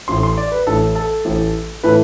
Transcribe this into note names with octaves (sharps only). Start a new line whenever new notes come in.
A1 A2 E3 A3 C6
C6
D5
B4
A1 A2 E3 A3 A4
A4
A1 A2 E3 A3
A2 E3 A3 B4